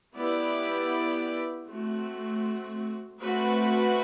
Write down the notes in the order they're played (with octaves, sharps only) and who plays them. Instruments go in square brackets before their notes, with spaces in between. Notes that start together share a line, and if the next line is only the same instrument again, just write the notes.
[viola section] B3 E4 G4 B4 D5
A3 C4 F#4
A3 C4 F#4 B4